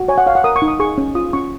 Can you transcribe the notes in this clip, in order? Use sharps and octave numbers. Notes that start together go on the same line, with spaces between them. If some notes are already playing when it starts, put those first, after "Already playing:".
Already playing: F#4
C#5 G#5
F#5
C#5 F5
F#5
A#4 D#6
C#6
D#4
D#6
G#4 C#6
C#4
F4 D#6
C#4 C#6